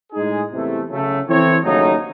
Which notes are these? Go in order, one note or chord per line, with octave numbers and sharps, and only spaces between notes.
A2 G#3 D#4 G#4
E2 C3 E3 A3
C#3 F#3 A3
E3 C4 E4 A4 C#5
D#2 C#3 F#3 A3 D#4